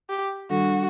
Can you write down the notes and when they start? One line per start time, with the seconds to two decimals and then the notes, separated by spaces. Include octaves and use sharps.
0.10 G4
0.50 D#3 G3 D4 F#4 A4